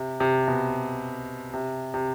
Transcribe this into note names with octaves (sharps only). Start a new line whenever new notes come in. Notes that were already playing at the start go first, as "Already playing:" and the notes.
Already playing: C3
C3
B2
C3
C3